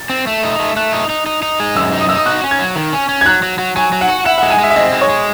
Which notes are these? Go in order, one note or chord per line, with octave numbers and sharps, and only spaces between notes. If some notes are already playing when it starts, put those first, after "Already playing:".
Already playing: A6
C4
A3
D#4
A3
A3 F#6
D#4
D#4
D#4
D#4
G#3
F#2 E6
D#4
D#6
D#4 E6
D#6
F#4 F#6
C#4
G#6
F#3
D#3
C#4
C#4
G#6
F#3 F#6
F#3
F#3
F#3 G#5
F#3
F#5
F#4
E4 F#5
F#5
G#3
G#5
G#3 E5
E5
C4 D#5
G#3
C#5
G#3